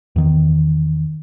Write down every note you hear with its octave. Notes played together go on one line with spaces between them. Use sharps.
E2 D#3